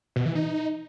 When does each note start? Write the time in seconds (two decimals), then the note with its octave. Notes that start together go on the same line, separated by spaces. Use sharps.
0.16 B2
0.26 E3
0.35 D#4